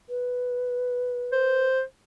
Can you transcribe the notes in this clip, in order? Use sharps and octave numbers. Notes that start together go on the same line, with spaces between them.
B4
C5